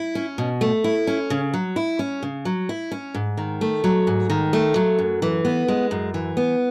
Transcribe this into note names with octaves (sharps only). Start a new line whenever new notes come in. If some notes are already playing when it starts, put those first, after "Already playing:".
Already playing: E4
C#4
B2
A3
E4
C#4
C#3
F#3
E4
C#4
C#3
F#3
E4
C#4
G#2
D#3
A3
F#3
G#2
D#3
A3
F#3
F#2
E3
B3
G#3
F#2
E3
B3